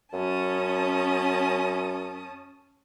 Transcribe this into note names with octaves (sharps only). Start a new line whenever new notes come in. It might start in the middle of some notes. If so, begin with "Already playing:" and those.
F#2 C#4 A5 D#6